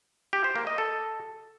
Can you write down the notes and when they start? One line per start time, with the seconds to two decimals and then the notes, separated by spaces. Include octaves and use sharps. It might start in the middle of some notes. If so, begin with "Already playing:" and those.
0.33 G4
0.44 C5
0.56 A#3
0.67 D#5
0.78 A4